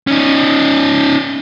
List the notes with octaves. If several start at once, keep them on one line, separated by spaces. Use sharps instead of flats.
C#4 D#4